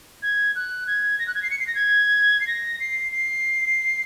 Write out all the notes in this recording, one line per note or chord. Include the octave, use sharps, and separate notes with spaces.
G#6
F#6
G#6
A#6
F#6
G#6
C7
C#7
C7
A#6
G#6
C7
A#6
C7
C7